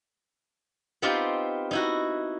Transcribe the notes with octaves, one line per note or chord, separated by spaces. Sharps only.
B3 C4 D#4 F4 G4
D#4 E4 F#4